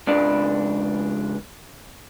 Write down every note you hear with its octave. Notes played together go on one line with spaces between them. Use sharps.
C#2 G#2 C#3 D4